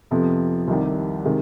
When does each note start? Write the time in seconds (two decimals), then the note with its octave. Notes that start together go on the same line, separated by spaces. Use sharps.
0.11 F2 C3 F3 B3
0.68 C2 C3 D#3 G3
1.25 C3 D#3 G#3